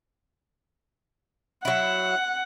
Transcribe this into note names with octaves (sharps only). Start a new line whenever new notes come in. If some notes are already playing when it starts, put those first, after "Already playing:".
F#3 E4 F#5